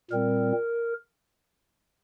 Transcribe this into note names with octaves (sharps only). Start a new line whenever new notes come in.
A#2 G3 C4 A#4